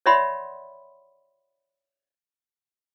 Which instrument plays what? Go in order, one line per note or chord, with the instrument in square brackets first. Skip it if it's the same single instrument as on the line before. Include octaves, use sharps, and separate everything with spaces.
[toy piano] C#5 D5 E5 F#5 B5 C6